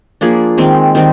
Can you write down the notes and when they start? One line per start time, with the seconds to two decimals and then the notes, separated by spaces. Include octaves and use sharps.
0.21 F3 A#3 D4 G#4
0.58 D#3 G#3 C4
0.95 D#3 G3 C4